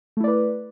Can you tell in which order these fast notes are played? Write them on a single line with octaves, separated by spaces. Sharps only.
A3 E4 D5 B4